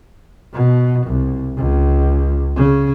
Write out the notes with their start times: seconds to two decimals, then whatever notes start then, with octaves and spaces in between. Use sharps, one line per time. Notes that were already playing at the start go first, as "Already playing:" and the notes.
0.54 B2
1.07 C2
1.57 C#2
2.56 C#3